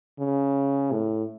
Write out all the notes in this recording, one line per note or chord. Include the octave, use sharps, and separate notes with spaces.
C#3
A2